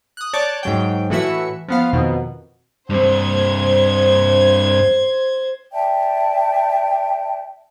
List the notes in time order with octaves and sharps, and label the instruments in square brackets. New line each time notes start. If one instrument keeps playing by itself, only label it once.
[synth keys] D#6 F#6
C#5 D5 A5 F#6 G6 A6
G#2 F#3 G5
A2 E3 F#4 E5 C#7
F3 B3 F5
F2 B2 D#3
[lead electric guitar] G2 C4 [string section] C5 G#6
[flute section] D5 E5 G5 A5